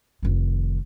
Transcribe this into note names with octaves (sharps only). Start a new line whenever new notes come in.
F1 D#3